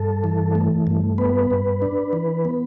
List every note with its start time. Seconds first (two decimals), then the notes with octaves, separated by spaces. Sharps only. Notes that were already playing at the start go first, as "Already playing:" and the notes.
Already playing: G2 A4
0.24 E3
0.55 A3
0.87 G2
1.18 B3 B4
1.51 G2
1.82 D4
2.13 E3
2.45 B3